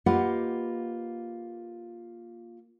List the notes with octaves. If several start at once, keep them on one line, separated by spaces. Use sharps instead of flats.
A#3 F4 G4 B4 D#5 F#5